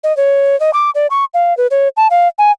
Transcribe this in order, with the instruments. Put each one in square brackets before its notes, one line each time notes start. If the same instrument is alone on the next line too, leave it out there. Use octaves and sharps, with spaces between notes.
[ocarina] D#5
C#5
D#5
D6
D5
C#6
F5
B4
C#5
A5
F5
G#5